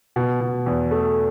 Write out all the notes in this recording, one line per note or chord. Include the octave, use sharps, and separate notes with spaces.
B2
B2
E2
A3